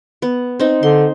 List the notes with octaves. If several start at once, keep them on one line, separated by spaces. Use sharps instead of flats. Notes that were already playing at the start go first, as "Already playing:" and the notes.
B3
C4 D#4
D3 C6